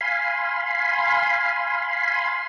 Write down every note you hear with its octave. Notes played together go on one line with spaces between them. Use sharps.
F5 G#5 B5 C6